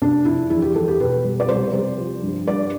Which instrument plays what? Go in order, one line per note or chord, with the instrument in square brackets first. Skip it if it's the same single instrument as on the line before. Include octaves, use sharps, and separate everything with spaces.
[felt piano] C3 D4
F3 E4
E2 E4
G4
E2 A4
G4
B2 B4
G3
D5
C2 C5
C2
F3
G2
G2 D5